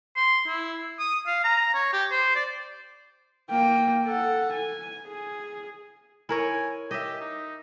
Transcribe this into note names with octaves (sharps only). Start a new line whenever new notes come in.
C6
E4
D#6
F5
A#5
C#5
G4
C5
D5
A#3 G5
A4 F#5
G#5
G#4
E4 A#4 C#5 G#5
G4 D#5 E5
D#4